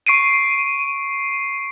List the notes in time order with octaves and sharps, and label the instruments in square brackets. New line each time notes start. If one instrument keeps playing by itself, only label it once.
[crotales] C#6 C7 D7 D#7